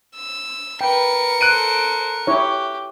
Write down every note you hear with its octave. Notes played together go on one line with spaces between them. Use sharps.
E6
A#4 B4 G5 C#7
A4 C5 F#6 D7 D#7
E4 G4 C#5